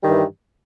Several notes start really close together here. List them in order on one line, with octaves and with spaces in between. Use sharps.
G3 D#3 G2 E3